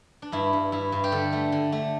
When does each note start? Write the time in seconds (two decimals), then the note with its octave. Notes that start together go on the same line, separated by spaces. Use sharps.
0.22 D4
0.32 G2 E4
0.53 G2
0.72 G2 E4
0.92 G2
1.04 G4
1.12 D3 A4
1.33 A3
1.52 D3
1.72 A3